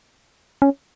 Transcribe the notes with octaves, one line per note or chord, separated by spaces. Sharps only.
C#4